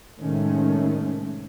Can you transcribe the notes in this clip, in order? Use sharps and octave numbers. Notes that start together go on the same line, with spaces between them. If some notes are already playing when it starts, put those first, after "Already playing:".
A2 C3 D#3 G#3 A3 C#4